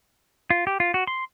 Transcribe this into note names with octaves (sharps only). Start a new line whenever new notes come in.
F4
G4
F4
F#4
C6